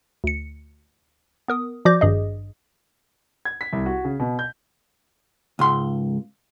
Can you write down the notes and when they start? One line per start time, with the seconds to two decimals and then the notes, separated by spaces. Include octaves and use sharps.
0.24 D2 C#7
1.48 B3 A#4 D#6
1.85 F3 F#4 D5 D6 G6 A#6
2.01 G#1 G2 G#4 D#5
3.45 G#6
3.61 B6
3.73 C2
3.86 F#4
4.05 C#3
4.20 B2
4.39 G6
5.59 C#2 G#2 C6